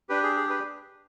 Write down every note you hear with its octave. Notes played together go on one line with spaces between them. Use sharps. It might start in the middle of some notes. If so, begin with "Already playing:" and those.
D4 G4 B4
G#4
G#4
B4